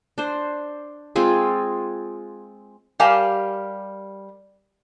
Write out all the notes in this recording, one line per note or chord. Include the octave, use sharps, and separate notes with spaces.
D4 C5
G#3 C4 F4 G#4
G3 G4 A#4 F5 G#5 A5